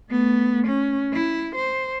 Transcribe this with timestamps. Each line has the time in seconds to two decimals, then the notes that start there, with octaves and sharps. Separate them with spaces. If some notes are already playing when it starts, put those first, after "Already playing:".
0.10 A3 B3
0.66 C#4
1.13 E4
1.55 C5